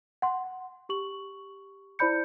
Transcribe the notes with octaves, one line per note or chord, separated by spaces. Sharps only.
F#5 C6
G4 C#6 F#7
E4 C5 D5 B5 G6 C#7